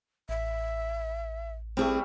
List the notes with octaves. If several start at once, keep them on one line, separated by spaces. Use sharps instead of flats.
A1 E5
G3 A3 C4 E4 G#4